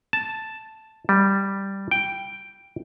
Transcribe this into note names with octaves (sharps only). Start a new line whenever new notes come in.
A5
G3
G5